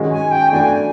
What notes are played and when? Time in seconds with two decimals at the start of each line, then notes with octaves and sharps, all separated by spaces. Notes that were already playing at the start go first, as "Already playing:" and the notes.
Already playing: D#3 G#3 C#4 F#4
0.12 G#5
0.31 G5
0.52 E3 A3 D4 F#4 G#5